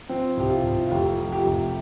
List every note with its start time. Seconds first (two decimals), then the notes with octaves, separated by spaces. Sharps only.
0.09 F3 C4
0.37 C2 G4
0.50 F4
0.64 C2
0.87 F4
0.91 F1 G4
1.19 F3
1.32 G4
1.46 F1